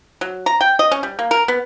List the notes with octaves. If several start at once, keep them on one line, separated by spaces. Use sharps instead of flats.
F#3
A#5
G5
D#5
C#4
G3
A#3
A#4
B3